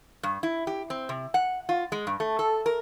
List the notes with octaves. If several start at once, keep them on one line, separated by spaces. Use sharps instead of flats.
G2
E4
G4
C4
C3
F#5
F4
G#3
G2
A3
A4
A#4